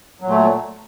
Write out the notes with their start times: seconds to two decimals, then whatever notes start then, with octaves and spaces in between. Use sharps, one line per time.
0.21 F#3
0.26 A#2
0.30 A3